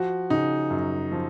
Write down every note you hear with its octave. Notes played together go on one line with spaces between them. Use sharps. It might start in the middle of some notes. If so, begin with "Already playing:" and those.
Already playing: F3 F#4
C#3 D#4
F#2
F3